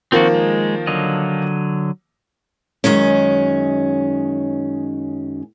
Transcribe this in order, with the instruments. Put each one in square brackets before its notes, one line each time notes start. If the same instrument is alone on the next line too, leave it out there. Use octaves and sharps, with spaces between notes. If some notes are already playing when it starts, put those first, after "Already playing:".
[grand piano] D#3 F3 A#3 [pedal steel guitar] C4 F#4
[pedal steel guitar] G#3
D3 F#3 D#5
[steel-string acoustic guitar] F#2 D#3 G#3 C#4